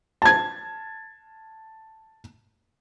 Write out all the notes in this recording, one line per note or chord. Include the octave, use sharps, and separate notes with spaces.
A5 G#6